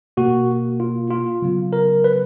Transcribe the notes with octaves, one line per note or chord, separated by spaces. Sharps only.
B2 A#3 F#4
F4
F4
C#3 F#3 B3
A#4
B4